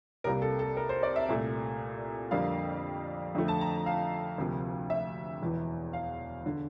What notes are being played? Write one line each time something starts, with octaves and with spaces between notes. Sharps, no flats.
C2 C3 G3 A#3 A#4
A4
A4
A#4
C5
D5
E5
C2 A#2 A3
F2 D3 G3 A#3 F5
F2 D3 F3 A3
A5
A#5
F5
D2 C3 F3 A#3
E5
E1 E2 E3
F5
D3